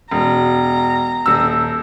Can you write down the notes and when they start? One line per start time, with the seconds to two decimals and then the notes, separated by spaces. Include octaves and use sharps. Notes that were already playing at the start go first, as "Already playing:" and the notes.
0.11 E1 A#5
1.26 D#1 E6